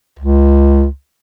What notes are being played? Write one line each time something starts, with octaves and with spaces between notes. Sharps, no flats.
C#2